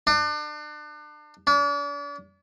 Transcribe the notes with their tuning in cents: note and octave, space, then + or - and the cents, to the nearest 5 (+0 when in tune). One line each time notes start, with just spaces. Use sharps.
D4 +35
D4 -40